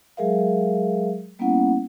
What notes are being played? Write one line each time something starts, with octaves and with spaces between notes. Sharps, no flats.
F#3 G#3 G#4 A#4 E5 F5
G3 A#3 B3 C#4 E4 F#5